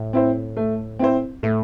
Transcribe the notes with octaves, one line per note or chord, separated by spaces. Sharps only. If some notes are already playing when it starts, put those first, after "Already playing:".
Already playing: A2
C4 E4 C5
A3
C4 E4 C5
A2 A3